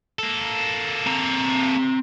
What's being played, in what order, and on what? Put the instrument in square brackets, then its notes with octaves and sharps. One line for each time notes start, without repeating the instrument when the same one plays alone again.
[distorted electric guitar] A#3 A4
[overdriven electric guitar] C4 A#5